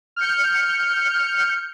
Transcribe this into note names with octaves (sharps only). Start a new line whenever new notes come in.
F6 G6 C#7